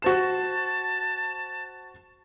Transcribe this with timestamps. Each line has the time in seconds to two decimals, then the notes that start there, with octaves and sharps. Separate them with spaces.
0.02 F#4 C5 A5 E7